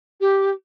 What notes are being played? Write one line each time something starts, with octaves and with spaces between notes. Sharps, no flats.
G4